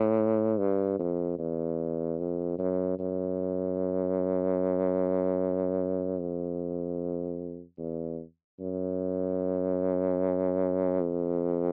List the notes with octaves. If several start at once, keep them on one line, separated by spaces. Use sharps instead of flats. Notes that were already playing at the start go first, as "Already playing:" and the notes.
Already playing: A2
G2
F2
E2
F2
F#2
F#2
F2
E2
F#2
F2